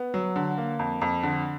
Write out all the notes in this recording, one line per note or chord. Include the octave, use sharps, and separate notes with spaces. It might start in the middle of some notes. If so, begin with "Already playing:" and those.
Already playing: B3
F#3
D3
A#3
F2
F2
D3